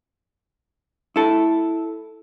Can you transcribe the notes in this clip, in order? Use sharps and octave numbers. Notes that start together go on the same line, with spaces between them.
E4 A4